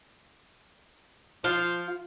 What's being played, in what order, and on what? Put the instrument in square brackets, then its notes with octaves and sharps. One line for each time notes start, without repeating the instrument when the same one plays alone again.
[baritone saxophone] F3 [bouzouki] F4